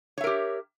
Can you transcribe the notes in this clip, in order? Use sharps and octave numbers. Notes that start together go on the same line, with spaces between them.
G4 A#4 C#5 E5